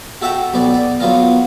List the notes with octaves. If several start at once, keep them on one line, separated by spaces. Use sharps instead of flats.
F#4 A4 E5 F#5 G5 A#5
B1 B3 D5
D5
F#3 B3 F4 A#4